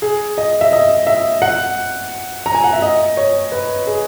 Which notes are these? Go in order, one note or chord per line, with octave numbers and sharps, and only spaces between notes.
G#4
D#5
E5
D#5
E5
F#5
A#5
G#5
F#5
E5
D#5
C#5
B4
G#4